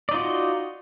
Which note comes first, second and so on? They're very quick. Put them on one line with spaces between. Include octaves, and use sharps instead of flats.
D5 D#4 F4 F#4